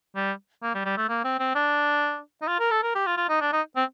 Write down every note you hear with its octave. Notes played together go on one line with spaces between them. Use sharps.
G3
A#3
G3
G3
A3
A#3
C4
C4
D4
D#4
F4
A#4
A4
A#4
G4
F4
F4
D#4
D4
D#4
C4